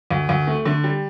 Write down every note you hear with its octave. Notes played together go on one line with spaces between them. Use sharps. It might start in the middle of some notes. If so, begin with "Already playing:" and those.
D2
D2
A3
D3
G3